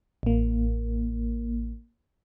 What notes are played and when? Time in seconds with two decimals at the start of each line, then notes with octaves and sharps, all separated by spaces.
0.23 A1 A#3